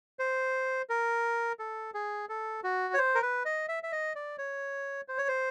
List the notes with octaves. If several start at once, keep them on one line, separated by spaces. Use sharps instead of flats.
C5
A#4
A4
G#4
A4
F#4
C#5
C5
A#4
B4
D#5
E5
E5
D#5
D5
C#5
C5
C#5
C5